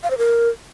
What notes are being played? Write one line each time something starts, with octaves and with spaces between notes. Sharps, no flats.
F5
C5
A#4